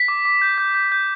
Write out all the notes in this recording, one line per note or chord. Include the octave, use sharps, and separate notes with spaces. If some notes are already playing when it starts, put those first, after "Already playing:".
Already playing: B6
D6
D6
G6
G6
G6
G6